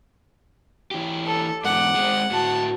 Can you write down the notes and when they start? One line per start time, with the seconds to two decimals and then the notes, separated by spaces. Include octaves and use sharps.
0.91 E3 G4
1.26 A4
1.64 E2 G#2 F#5 D6
1.95 G#3 C4
2.31 A2 F#4 A5